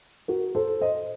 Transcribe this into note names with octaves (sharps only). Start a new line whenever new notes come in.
F#4 A#4
A4 C5
C5 D#5